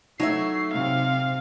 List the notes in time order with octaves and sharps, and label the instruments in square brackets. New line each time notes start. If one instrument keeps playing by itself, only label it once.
[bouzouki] F#3 C#5 E5 [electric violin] A3 C7 [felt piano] D#4
[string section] C3 [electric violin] F5